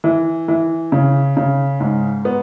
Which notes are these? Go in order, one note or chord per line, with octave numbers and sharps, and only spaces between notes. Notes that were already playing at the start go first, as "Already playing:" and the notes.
E3
E3
C#3
C#3
G#2
B3